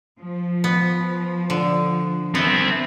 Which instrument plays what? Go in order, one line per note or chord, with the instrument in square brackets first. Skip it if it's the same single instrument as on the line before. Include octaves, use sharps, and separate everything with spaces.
[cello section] F3
[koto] B3
D3
[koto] B3 [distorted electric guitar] C4 E4